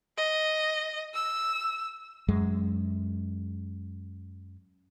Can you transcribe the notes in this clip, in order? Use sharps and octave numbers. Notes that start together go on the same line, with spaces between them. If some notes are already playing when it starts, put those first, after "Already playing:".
D#5
E6
F#2 G#3